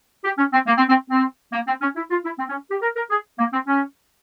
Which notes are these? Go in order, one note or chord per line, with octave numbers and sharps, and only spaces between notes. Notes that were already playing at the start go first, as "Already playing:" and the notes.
G4
C#4
C4
A#3
C4
C4
C4
A#3
C4
C#4
E4
F4
E4
C4
C#4
G4
A#4
A#4
G#4
A#3
C4
C#4